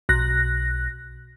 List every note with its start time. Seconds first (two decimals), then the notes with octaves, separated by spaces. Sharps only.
0.09 B1 F#6 A#6